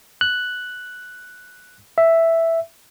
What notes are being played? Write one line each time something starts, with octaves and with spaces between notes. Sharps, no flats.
F#6
E5